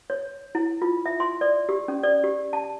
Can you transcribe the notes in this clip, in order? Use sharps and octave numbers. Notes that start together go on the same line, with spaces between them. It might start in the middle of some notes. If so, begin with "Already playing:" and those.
C#5
E4
F4
E5
C6
D5
G4
C#4
D5
G4
A5